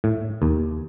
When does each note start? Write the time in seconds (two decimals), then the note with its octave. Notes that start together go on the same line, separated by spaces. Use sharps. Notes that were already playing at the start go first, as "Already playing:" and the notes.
0.04 A2
0.42 D#2